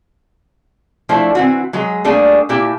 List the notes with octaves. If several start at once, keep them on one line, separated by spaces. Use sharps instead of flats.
F3 A3 D4 E4 C5
E3 C4 F#4
F#3 G#3 G#4
G3 A3 A#3 D4 G#4
A#2 E4 G4 A5